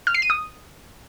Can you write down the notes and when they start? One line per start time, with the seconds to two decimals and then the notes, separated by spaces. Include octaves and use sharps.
0.07 F6
0.14 C7
0.22 D#7
0.30 D#6